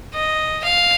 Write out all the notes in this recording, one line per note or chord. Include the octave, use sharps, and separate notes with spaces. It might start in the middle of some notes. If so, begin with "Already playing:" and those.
D#5
F5